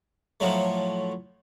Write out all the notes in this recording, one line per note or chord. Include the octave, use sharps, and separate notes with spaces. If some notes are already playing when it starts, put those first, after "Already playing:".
A2 F3 F#3 A3